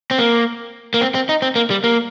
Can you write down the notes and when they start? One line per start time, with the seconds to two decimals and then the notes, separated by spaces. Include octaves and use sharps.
0.11 C4
0.18 A#3
0.94 A#3
1.01 C4
1.14 C4
1.29 D#4
1.42 C4
1.56 A#3
1.70 G3
1.84 A#3